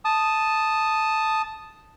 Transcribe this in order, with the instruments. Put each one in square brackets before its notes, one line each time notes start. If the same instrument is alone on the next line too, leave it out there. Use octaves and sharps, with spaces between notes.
[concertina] A5 D#6